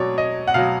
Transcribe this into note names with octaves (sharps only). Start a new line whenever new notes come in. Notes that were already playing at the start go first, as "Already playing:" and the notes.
Already playing: B2 F#3 C#5 D5
D#5
F#5
B2 F#3 F5